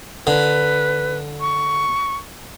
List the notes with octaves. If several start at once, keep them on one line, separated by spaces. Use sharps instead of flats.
D3 B4
C#6